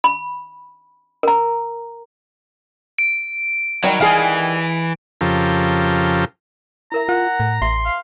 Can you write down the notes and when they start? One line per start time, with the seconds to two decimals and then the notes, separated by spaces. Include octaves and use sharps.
0.04 B5
1.23 A#4 A#5
2.98 D7
3.84 D#3 F#3 G3
4.01 E3 G#4 F5
5.21 F2 C#3 F3 G4 A4 A#4
6.92 E4 A#4 E5 A#5
7.09 F4 F#5
7.40 A2
7.62 A1 E5 C6
7.85 F5